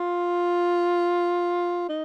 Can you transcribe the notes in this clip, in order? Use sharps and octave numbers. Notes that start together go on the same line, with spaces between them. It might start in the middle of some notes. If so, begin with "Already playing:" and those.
Already playing: F4
D#4